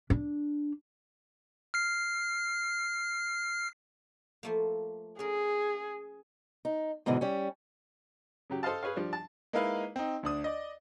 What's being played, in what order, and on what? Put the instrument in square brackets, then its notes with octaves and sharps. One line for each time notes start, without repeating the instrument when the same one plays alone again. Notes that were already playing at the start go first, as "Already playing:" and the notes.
[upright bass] D4
[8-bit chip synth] F6 C7
[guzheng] F3 A3 A#3
[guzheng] C#4 A#4 [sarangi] G#4
[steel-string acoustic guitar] D#4
G#2 B2 D3 E3
G3 C#4
[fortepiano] C#3 F#3 G4
A4 C5 D#5 F5 A5
G#4 B4 C#5 F5
F3 G3 D4
A5
[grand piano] G#3 A#3 D#4 E4 B4 F5
C4 D#4
D2 D4 D#6
D5 D#5